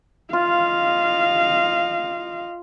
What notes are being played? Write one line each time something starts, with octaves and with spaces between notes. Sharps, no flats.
F4 D#5 F5